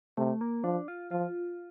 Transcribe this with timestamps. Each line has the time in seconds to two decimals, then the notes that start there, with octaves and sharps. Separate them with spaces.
0.17 C3 A3
0.41 A#3
0.64 F3 D4
0.88 F4
1.11 F3 F4